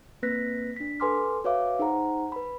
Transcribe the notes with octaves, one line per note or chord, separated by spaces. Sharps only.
A#3 C4 B4 F#6 A#6 B6
D4 B6
A4 B4 G#5 C6 D6 F6
F#4 B4 C#5 E5 F5 D6
D#4 G#4 C5 F#5 A#5
B4 B5